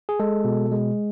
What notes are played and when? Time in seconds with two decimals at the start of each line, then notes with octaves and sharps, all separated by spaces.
0.09 G#4
0.20 G#3 A4
0.45 B2
0.72 G#3